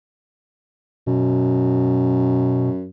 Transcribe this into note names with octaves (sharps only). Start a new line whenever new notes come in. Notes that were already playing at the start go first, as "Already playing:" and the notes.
F#2 B2